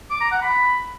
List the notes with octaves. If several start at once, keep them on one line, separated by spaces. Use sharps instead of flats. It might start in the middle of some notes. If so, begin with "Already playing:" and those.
D6
A#5
F#5
B5